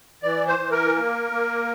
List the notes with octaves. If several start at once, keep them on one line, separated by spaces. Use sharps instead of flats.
E3 D5
C5
E3
A#4
A#3
A#3